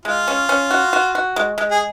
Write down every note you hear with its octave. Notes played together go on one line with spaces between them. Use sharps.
G#3 F4
C#4
C#4
F#4
F#4
F#4
G#3
G#3
G#4